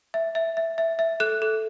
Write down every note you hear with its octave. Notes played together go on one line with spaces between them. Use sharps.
E5
E5
E5
E5
E5
A4 F#6
A4